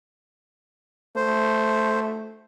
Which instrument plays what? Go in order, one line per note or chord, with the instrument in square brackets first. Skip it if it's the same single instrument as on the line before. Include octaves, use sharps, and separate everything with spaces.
[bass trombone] A3 [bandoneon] C5